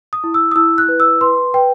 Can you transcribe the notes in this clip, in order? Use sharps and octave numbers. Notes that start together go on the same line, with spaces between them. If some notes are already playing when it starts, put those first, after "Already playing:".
D#6
E4
E6
D#6
E4 E6
F#6
B4
E6
B4 C6
B4 G5